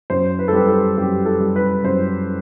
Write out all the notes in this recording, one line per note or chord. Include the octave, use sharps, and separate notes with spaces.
F#2 C5
B4
A4
G3 B4
A4
F#2 G4
A4
G3
B4
F#2 C5